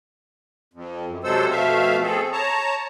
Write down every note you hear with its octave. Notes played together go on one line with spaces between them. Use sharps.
F2
F#2
C3 F#3 G#3 A4 C5 E6
F2 B2 A3 E5 F5
C4 G#4 A4
C#5 A5 A#5